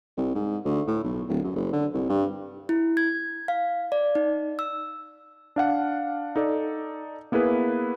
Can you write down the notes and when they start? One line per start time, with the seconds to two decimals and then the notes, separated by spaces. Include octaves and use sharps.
0.18 C2
0.36 G#2
0.65 D2
0.88 A2
1.04 B1
1.29 D1
1.44 F#2
1.56 F#1
1.73 D3
1.94 C2
2.09 G2
2.69 E4
2.97 G#6
3.48 F5
3.92 D5
4.15 D#4
4.59 E6
5.56 D4 F5 F#5
6.36 D#4 A4 D5
7.32 A#3 B3 E4 G#4 B4